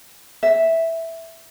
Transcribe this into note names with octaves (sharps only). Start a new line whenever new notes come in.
E5